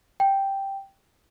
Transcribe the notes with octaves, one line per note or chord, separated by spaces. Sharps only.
G5